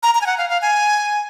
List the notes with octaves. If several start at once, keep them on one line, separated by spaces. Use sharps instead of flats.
A#5
A#5
G#5
F#5
F5
F5
G#5